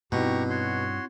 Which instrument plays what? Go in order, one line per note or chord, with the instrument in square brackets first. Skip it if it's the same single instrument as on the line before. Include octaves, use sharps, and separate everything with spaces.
[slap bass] G2 [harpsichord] B2 [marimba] C4 D#4 E4 [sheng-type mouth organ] G4 A#5 C#6
[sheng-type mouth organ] F#4 C#5 C6